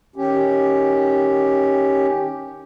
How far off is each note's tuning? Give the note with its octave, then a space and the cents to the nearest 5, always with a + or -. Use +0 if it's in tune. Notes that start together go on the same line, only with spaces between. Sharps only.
D#3 +0 C#4 +0 G4 +0